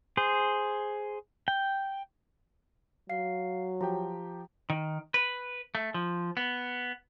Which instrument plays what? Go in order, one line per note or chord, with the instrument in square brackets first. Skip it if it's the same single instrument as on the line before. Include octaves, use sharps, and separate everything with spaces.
[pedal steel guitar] G#4 C5
G5
[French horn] F#3 [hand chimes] F5 C7
[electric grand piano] F3 G4 G5 [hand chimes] A#5
[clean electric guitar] D#3
B4
A3
F3
B3